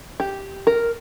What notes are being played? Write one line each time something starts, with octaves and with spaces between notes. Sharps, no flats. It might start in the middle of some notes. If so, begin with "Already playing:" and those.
G4
A#4